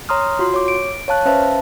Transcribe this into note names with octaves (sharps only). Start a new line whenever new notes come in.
C#5 A#5 C6 D#6 F6
F4 F#4 C6
C#5 D6
D7
C#5 F5 A5 F#6
C#4 B4 C5 E5 F5 A5